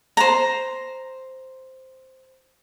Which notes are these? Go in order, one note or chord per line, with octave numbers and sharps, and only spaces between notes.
C5 A#5